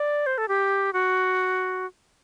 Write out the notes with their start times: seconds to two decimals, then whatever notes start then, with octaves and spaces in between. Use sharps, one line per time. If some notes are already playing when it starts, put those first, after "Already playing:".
Already playing: D5
0.26 C5
0.38 A4
0.48 G4
0.93 F#4